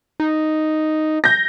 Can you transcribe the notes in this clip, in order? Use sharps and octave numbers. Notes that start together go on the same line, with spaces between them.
D#4
G6 A#6